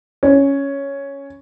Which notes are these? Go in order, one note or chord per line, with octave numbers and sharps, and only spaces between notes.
C#4